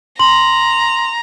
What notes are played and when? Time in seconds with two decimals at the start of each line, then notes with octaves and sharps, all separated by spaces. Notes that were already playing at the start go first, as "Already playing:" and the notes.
0.19 A#5 C6 F#7